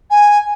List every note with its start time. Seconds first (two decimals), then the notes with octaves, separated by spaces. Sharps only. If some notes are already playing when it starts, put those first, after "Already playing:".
0.10 G#5